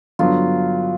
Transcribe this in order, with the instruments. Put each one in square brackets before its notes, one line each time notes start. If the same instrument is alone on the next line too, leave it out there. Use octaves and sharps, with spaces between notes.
[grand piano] G2 D3 F#3 B3 [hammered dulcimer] F4